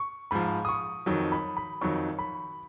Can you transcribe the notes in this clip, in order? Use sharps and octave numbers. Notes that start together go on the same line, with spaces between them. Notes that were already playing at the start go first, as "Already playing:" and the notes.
Already playing: C#6
G#2 F3 B5
D#6
C#6
F2 D#3 F#3
B5
B5
F2 D#3 F#3 C#6
B5